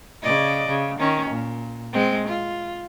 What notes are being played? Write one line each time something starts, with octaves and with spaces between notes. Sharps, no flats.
C#3 D5 D#5
C#3
D#3 C#4
A#2
G#3 C4
F4